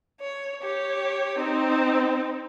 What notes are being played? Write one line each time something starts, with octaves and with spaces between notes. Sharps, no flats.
C#5
G4 C#5
C4 D#4